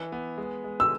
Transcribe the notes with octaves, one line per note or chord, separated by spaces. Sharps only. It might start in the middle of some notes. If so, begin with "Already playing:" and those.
Already playing: E3
B3
G#3
G#3
E6